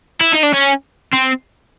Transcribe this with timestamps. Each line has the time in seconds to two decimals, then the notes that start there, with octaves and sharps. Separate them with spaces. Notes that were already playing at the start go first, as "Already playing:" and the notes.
0.21 E4
0.33 D#4
0.43 D4
0.54 C#4
1.13 C4